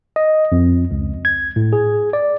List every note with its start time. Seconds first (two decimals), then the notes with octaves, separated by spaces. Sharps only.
0.16 D#5
0.52 F2
0.91 C#2
1.25 G#6
1.56 A2
1.73 G#4
2.13 D5